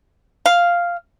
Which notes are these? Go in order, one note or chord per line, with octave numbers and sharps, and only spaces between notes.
F5